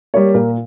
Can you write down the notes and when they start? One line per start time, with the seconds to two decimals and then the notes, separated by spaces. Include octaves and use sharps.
0.14 G3 A#3 C#5
0.34 A#2 A#4